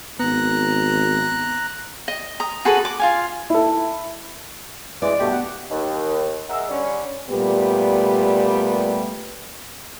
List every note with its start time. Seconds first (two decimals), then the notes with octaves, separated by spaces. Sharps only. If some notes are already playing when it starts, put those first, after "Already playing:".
0.20 G#1 B3 A#5 F#6
2.08 D#5
2.40 A#5 D#6
2.65 F#4 G#4 A4 B4
2.85 D6
2.99 F4 F5 G#5
3.50 E4 A4
5.02 E3 G#3 D5
5.20 G2 B2 A3 B3 G4
5.32 F#5
5.70 D#2
6.49 G#3 A#4 E5 F#5 E6
6.69 D3 G3 C#4
7.30 A#2 G3 A3 B3 G4